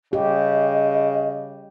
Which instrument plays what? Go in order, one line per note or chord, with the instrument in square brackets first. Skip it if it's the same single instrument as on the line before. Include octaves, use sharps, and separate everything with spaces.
[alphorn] C#3 [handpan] G4 [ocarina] D#5